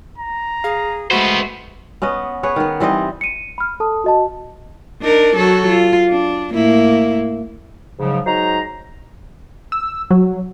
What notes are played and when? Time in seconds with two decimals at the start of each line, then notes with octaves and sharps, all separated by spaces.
0.18 A#5
0.64 G#4 F5
1.11 G#3 A3 B3 F#4 C5 B5
2.02 B3 C#4 B4 D#5
2.43 G#4 B4 C#5
2.56 D#3 B3
2.80 E3 G3 C4 D#5
3.21 C#7 D#7
3.58 B5 F6
3.80 A4 A5 D#6
4.04 F#4 D#5 A5
5.02 D4 D#4 A#4
5.36 F#3 F#4 A4
5.67 F4
6.09 D4
6.53 A2 A#3 E4
7.99 G#2 C#3 F3 F#3
8.26 F#3 G#3 D#4 C5 A#5
9.72 E6
10.11 F#3